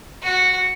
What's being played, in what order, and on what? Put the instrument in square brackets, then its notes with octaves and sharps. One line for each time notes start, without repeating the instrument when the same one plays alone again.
[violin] F#4